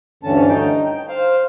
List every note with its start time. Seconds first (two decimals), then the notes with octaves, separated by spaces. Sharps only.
0.23 D2 G2 D3 E3 C#4 A5
0.49 D#4 G5
0.86 G5
1.08 C5 F5